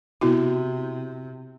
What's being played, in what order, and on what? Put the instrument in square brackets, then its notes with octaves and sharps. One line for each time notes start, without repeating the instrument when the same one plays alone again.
[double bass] C3 [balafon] B3 E4 F#4